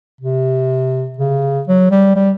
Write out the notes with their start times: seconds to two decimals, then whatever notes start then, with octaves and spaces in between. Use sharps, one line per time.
0.21 C3
1.18 C#3
1.67 F#3
1.91 G3
2.16 G3